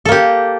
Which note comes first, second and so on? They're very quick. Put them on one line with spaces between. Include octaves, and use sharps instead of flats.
A4 A#3 G4